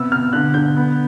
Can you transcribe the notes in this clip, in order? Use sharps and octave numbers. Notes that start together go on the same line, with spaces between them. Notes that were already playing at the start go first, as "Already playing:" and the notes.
Already playing: C3 B3 E6
B2 F6
D3 F#6
D3 G6
B3